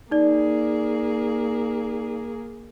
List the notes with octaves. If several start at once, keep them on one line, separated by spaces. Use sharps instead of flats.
A#3 D#4 G#4 D5